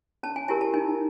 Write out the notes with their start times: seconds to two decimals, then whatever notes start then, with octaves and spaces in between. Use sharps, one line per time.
0.23 C#4 A5
0.36 G#5
0.48 E4 G4 A#4 G#5
0.61 A5
0.74 D#4 G#5